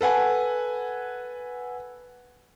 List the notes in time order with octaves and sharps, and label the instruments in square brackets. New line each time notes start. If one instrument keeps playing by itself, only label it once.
[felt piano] A4 B4 F#5 G#5